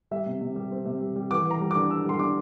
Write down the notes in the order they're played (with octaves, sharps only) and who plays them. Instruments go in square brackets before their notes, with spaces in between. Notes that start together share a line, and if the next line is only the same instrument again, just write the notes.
[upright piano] G3 E5
C3
C3
G3
C4
C3
G3
G3
E3 D6
E3
A#5
G3
D6
D4
D4 E6
G3 C6
D4 D6